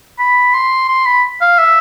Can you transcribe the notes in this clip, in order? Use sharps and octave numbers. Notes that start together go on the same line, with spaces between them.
B5
C6
C6
B5
F5
E5